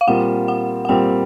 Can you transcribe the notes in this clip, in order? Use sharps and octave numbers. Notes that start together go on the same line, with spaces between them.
F5
A#2 G3 C4 F4 A#4 F#5
F#5
F#5
A#2 G3 C4 F4 A#4 G5